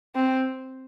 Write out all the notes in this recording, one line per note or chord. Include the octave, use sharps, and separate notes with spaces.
C4